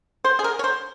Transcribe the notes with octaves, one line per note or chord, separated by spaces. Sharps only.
C5
G#4
A#4
C#5
C5